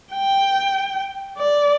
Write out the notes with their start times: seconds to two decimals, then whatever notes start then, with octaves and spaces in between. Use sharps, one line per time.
0.13 G5
1.37 D5